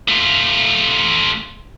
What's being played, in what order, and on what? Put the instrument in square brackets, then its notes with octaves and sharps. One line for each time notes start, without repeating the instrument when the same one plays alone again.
[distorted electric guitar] A3 F4